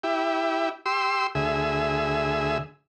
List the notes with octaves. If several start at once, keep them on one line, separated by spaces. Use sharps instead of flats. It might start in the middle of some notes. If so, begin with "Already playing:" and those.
E4 G4
G4 C6 E6
D2 G#4 E5